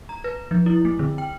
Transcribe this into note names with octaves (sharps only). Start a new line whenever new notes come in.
A#5
B4
F3
E4
A3
D3
G5